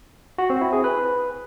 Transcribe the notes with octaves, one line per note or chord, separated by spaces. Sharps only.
F#4
C4
E4
G#4
B4